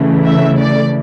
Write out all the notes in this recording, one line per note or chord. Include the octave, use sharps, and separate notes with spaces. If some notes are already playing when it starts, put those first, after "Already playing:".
Already playing: C#3 E3 A3
E5
D5